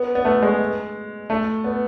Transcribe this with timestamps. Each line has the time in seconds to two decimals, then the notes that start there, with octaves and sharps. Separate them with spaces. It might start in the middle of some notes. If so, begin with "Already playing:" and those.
Already playing: B3
0.15 B3
0.25 A3
0.42 G#3
1.30 A3
1.64 B3